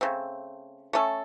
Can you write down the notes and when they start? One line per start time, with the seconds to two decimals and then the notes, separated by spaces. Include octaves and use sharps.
0.01 C#3 A3 C4
0.93 A3 C#4 A4